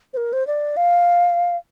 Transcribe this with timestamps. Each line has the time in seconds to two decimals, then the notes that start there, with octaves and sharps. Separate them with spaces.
0.14 C5
0.17 A#4
0.33 C5
0.47 D5
0.77 F5